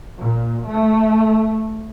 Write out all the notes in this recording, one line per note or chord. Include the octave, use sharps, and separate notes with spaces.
A#2
A3